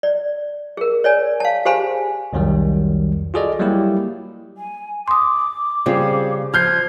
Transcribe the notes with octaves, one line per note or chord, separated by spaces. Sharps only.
D5
G#4 A#4
C#5 D5 G#5
F5 A5
G4 G#4 C5 F5 G#5 B5
C2 F2 D#3 F#3 G3
F4 F#4 G#4 A4 D5 D#5
F#3 G3 A#3 E4 G4
G#5
C6 D6 D#6
C#3 G3 C4 F4 G#4
F3 F6 G6 G#6 C7